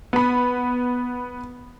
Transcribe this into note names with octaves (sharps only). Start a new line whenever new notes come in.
B3 B5